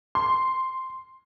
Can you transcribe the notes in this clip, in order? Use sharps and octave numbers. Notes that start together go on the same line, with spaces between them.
C6